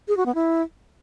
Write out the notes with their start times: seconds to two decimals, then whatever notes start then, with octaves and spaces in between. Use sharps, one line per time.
0.08 G#4
0.17 F#4
0.26 B3
0.35 E4